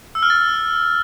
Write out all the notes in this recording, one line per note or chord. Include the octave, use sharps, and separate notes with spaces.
E6
F6
A6